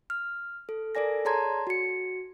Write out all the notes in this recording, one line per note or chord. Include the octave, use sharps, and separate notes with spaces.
F6
A4
A4 A#4 D5 G#5 A#6
G#4 C#5 A5 A#5 C6 G#6
F#4 C#7